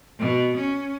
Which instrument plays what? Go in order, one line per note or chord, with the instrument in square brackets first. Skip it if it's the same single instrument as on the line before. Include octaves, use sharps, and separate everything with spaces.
[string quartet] B2
C#4